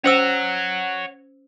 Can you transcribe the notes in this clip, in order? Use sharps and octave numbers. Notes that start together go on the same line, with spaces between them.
C#4 C5 C#5 F#5 E6